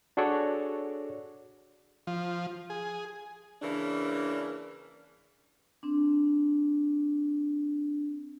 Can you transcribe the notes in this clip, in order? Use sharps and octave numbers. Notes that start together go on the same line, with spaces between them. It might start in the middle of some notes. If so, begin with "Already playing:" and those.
D4 F#4 G#4 A4 C#5 D5
F3
G#4
C#3 E3 A#3 D4
C4 D4